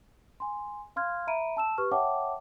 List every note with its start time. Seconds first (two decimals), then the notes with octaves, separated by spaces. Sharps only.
0.40 G#5 C6
0.96 F5 C6 F6 G#6
1.27 E5 A#5 B5 D7 D#7
1.57 A5 E6 E7
1.78 G4 B4 C#6 F6
1.92 C#5 E5 F#5 G5 A5 D6